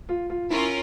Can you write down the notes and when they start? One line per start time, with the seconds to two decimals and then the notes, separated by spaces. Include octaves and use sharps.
0.09 F4
0.30 F4
0.50 C#4 E4 F4 A#4